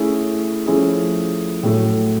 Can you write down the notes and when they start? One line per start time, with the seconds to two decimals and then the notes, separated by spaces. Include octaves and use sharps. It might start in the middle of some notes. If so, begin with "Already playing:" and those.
Already playing: A3 C#4 E4 G#4
0.66 F3 A3 C#4 E4 G#4
1.63 A2 F#3 A3